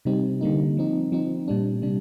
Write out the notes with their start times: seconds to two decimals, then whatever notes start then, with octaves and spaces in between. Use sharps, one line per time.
0.05 C3 G3 C4 D#4
0.41 D3 G3 A#3 D#4
0.77 F3 C4 D#4
1.12 F3 C4 D#4
1.48 A#2 G3 D4
1.82 C3 G3 D4